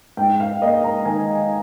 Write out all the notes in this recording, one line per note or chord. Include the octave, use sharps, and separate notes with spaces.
G#2 G5
F5
A#3 D#5
A#5
D#3 G#5